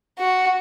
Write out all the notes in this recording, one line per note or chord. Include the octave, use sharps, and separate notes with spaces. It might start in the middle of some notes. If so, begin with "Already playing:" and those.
F#4